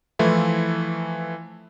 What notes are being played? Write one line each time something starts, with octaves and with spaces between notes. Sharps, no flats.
E3 F3 A3 E4 F4